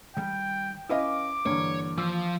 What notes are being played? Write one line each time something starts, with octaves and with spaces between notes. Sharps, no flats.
D#3 G3 G5
C#4 E4 B4 D#5 F5 D6
G2 D3 E3 A#3 C#5
F3 D6 E6